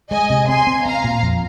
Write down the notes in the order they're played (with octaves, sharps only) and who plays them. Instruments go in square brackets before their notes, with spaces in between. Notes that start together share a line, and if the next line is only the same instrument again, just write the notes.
[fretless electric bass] G#3 [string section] D#5 G#5
[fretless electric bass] C3
[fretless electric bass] C4 [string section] G#5 C6
[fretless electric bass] C4
[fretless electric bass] C4 [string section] F5 A#5
[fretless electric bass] A#2
F2